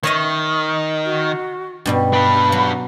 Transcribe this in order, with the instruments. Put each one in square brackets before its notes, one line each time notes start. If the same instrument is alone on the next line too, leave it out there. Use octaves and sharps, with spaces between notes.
[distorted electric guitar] D#3 [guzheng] C#5 D#5 E5
[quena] F#4
[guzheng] G2 B2 G3
[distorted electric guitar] D4 B4 [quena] B5
[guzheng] F#3